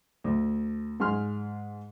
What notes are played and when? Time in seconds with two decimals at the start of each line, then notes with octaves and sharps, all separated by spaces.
0.24 D2
1.00 G#2 G#4 C6 F6